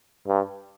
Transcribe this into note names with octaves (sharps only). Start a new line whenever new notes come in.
G2